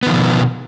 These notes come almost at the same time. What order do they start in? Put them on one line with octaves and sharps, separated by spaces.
B3 D#3 F3 B2